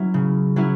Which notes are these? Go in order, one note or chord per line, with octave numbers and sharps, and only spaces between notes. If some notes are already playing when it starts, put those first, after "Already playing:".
Already playing: F#3 C#4 E4
C#3
F#3 C#4 E4